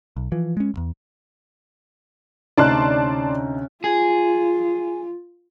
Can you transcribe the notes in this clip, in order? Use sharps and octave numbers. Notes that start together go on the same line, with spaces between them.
B1
E3 F3
G#3 C#4
E1 E2
D2 C3 C#4 D#4 D5 A5 C6 F#6
F4 G#4